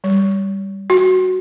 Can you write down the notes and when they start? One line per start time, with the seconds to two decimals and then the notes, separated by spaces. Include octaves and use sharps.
0.04 G3
0.90 F#4